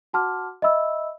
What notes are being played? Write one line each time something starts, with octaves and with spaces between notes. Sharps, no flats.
F#4 F#5 A5 C6 D6 F6
D#5 E5 B5 E6